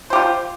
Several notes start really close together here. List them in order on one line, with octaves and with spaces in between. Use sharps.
C5 G4 F4